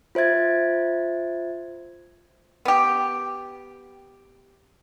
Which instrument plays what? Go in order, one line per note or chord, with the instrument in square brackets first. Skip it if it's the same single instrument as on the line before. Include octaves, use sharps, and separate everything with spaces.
[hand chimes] F4 C5 E5 G#6 A6
[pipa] B3 G4